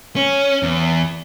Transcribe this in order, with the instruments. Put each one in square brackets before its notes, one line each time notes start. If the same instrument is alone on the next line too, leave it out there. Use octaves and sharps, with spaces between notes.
[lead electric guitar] C#4
E2